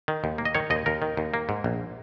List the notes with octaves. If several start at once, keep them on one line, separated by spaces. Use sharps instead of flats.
D#3
D#2
A#3
D#5
D#3 C#5
D#2 D#5
D#2 A#4
D#3
D#2
A#3
G#2
A#1